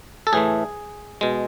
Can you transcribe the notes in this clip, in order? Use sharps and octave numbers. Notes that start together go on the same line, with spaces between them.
A4
A2 E3 A3 G#4
B2 G#3